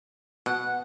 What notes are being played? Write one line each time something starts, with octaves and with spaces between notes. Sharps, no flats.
B2 F#5